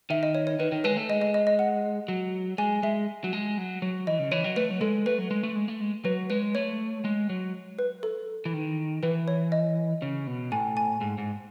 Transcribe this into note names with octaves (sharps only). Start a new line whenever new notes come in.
D#3 E5
D#5
C#5
C#5
D#3 B4
D#3
G#3 B4
A3
G#3 D#5
D#5
D#5
D#5
F#5
F#3
G#3 G#5
G#3 E5
F#3
G#3
F#3
F#3
E3 D#5
C#3
E3 C#5
F#3
A3 B4
F#3
G#3 A4
A3 B4
F#3
G#3
A3
G#3
A3
G#3
F#3 B4
G#3 B4
A3 C#5
G#3
F#3
B4
A4
E3
D#3
E3 B4
C#5
D#5
C#3
B2
A2 G#5
G#5
G#2
G#2